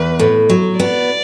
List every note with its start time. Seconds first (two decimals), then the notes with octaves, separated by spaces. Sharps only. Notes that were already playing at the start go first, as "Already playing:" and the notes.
Already playing: E2 B4
0.19 A2
0.50 F#3
0.79 B3 D5